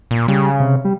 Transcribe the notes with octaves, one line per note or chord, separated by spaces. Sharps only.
A#2
C#3 G3
C3
G3